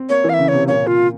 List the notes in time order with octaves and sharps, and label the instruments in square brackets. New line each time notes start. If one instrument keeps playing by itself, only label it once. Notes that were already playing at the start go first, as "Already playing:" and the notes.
Already playing: [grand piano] C4
[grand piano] A#3 [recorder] C#5
[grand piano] E3
[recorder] F5
E5
[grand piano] C#3
[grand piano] C3 [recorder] C#5
[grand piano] A#2 [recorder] C#5
[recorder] F4